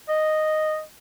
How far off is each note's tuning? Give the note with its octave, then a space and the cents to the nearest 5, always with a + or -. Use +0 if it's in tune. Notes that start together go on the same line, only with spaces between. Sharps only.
D#5 -5